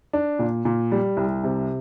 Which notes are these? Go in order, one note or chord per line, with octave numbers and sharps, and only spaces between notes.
D4
A#2
A#2
G3
C2
C3